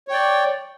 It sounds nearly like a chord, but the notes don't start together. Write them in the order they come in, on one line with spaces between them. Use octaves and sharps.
C#5 G5 D5